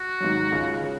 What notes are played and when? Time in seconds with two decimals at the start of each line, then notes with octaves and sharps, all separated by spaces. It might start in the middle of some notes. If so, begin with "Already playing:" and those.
Already playing: F#4
0.20 G#2 D#3 F#3
0.52 C#2 C#3 G#3
0.83 C#3